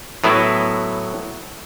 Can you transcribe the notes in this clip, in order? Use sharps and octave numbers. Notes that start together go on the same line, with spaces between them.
A2 F#3 B3 E4